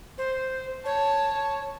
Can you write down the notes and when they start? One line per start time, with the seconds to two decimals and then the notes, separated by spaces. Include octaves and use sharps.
0.18 C5
0.85 C#5 A5